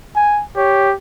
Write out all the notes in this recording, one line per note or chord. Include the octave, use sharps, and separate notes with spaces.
G#5
G4 C#5